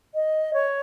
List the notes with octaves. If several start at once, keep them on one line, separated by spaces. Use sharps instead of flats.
D#5
C#5